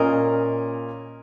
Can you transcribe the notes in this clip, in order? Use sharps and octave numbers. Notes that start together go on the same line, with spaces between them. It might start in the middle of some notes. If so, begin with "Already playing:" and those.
Already playing: A#2 A#3 C#4 A#4 D#5